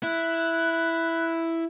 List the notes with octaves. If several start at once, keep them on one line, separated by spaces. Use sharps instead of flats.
E4 F#6